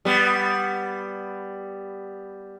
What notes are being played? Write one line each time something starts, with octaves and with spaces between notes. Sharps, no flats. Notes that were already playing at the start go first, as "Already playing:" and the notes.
G3 B3